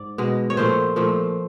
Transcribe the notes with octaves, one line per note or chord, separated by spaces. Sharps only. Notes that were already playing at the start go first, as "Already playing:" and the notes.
Already playing: G#2 D5
B2 G#3
C#5
A#2 F3 A3 C5
A#2 F3 A3